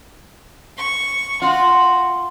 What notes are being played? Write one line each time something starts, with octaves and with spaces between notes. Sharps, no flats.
C#6
F4 F#4